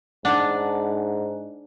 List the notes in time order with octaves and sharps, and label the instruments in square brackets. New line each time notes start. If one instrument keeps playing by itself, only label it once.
[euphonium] G#2 [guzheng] D4 [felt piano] F#5